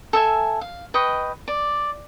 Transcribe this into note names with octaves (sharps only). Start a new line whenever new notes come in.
A4 E5 G#5
F5
B4 D#5 G5 C#6
D5